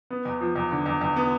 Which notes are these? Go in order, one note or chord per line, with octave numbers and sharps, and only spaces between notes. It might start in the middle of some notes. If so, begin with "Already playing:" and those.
B3
E2
F3
E2
D3
E2
E2
B3